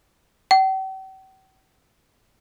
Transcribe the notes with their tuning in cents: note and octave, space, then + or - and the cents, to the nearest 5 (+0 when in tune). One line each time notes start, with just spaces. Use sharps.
G5 -45